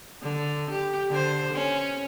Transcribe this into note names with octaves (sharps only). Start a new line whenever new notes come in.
D3
G4
D3 C5
C#4